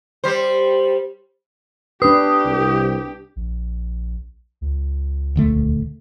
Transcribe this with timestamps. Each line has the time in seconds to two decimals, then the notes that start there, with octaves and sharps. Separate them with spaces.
0.24 G3 C5
2.02 D4 G4 B4 D#6
2.44 C2
3.36 A#1
4.61 C#2
5.36 D#1 D3 A3